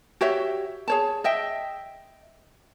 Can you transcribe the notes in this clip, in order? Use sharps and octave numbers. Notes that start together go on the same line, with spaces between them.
F#4 G4 C#5 E5
G#4 C#5 A5
D#5 E5 G5